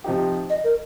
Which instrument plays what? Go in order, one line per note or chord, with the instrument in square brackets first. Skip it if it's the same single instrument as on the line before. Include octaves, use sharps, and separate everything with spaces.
[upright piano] C3 F3 D#4 G4
[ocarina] D#5
A#4